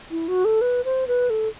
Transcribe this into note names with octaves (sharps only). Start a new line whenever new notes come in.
E4
F#4
A4
B4
C5
B4
A4